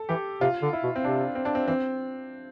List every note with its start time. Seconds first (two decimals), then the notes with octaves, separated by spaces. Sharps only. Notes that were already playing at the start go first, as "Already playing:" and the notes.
Already playing: A4
0.09 E3 G4
0.41 C3 F4
0.62 D3
0.73 E4
0.83 B2
0.96 C4
1.04 C3 D4
1.35 C4
1.45 D4
1.55 C4
1.67 E3 C4